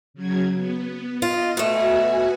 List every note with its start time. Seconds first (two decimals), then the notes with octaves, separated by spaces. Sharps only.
0.14 C#3 F#3 G#6
0.55 B3
1.22 F4 D#5
1.57 B2 A3 F#4 B4 G#5